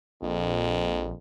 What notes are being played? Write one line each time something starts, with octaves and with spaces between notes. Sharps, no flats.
A#1 F2